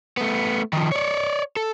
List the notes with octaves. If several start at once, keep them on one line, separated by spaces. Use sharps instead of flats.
A3 B3
D#3 F3
C#5 D5
A4